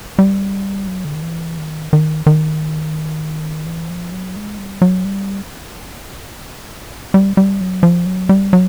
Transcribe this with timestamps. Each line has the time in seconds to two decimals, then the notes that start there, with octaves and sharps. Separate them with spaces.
0.19 G3
0.87 F#3
1.05 D3
1.14 D#3
1.22 E3
1.58 D#3
1.93 D#3
2.26 D#3
3.66 E3
3.90 F3
4.12 F#3
4.36 G#3
4.59 G3
4.82 F#3
5.05 G3
7.14 G3
7.37 G3
7.61 F#3
7.83 F3
8.06 F#3
8.29 G3
8.53 F#3